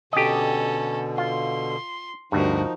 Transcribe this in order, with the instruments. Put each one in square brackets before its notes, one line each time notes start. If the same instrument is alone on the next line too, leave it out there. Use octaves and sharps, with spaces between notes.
[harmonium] B2 D3 [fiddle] C#4 A4 [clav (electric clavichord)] G4 D#5
[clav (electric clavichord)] F4 [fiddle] C6
[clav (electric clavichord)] D2 G2 [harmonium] F3 D#4 [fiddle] F#4 A#4